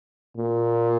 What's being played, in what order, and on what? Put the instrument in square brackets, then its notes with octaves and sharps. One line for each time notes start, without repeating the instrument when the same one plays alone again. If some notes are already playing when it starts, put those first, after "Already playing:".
[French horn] A#2